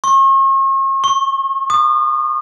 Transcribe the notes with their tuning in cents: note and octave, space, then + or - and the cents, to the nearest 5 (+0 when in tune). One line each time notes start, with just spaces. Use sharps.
C#6 -40
C#6 -15
D#6 -40